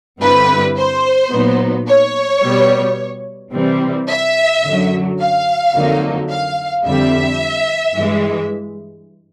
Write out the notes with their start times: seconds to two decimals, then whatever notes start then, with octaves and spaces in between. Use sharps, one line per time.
0.21 G2 D3 G3 C4 E4 B4
0.77 C5
1.31 A#2 F#3 B3 D#4
1.87 C#5
2.43 B2 G3 B3
3.53 C3 E3 G3 C4
4.09 E5
4.64 F#2 D3 F#3
5.20 F5
5.74 F2 D3 F#3 A#3 D#4
6.30 F5
6.85 F2 D3 G3 C4 E5
7.96 G2 E3 G#3